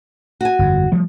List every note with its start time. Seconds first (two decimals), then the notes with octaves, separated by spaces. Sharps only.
0.41 F#4 G#5
0.59 G1 F2
0.92 F3 G3 A3